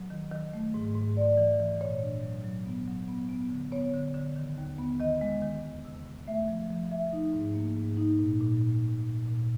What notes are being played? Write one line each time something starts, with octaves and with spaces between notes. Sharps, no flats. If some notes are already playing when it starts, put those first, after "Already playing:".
Already playing: F#3
D#3
D#3
A3
G#2
G#2
G#2 D5
E3
E3
A#2 C#5
D4
F#3
F#3
B3
F#3
B3
B3
D3
B3 C#5
D3
D3
D#3
D#2
B3
D#3 D#5
G#3
D#3
E2
C3
C3
A3 E5
F3
F3
F3 E5
D#4
G#2
A#3
G#2
D#4
A#2
A#2
A#2
A#2
A#2
A#2